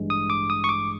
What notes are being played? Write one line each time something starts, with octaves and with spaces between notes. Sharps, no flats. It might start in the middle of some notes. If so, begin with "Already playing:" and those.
Already playing: A1 G2 E3 G#3
D#6
D6
D#6
C#6
D6